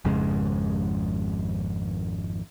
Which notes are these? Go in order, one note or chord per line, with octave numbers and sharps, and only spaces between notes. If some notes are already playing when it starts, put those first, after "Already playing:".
G#1 F2 C#3 G#3